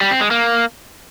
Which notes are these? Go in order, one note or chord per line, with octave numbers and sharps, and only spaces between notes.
G3
C4
G#3
A#3